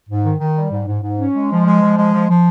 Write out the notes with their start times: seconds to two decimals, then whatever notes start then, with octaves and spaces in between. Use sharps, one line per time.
0.09 G#2
0.24 D#3
0.40 D#3
0.56 G3
0.72 G#2
0.87 G#2
1.03 G#2
1.19 C#4
1.35 G#3
1.51 F3
1.66 G#3
1.81 F3
1.98 G#3
2.13 F3
2.29 F3